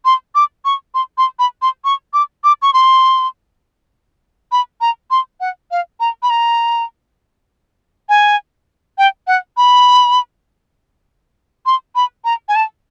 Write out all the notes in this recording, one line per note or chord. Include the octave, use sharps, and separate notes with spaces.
C6
D6
C#6
C6
C6
B5
C6
C#6
D6
D6
C#6
C6
B5
A#5
C6
F#5
F5
A#5
B5
A#5
G#5
G5
F#5
B5
C6
B5
A#5
G#5
A5